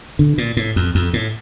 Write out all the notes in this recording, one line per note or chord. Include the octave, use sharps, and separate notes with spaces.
D3
A#2
A2
F2
F2
A2